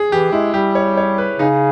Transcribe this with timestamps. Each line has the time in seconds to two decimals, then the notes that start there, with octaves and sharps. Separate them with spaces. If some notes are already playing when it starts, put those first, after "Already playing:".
Already playing: G#4
0.11 E3 G4
0.32 G#3 E4
0.54 G3 G4
0.75 C#5
0.97 C#5
1.18 B4
1.39 C#3 D#4